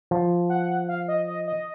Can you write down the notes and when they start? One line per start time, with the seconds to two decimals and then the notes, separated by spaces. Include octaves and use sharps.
0.11 F3
0.50 F#5
0.89 F5
1.08 D#5
1.28 D#5
1.47 D#5